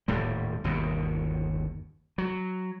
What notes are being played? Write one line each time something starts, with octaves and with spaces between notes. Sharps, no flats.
D#1 A2 G3
G1 D#2 B2
F#3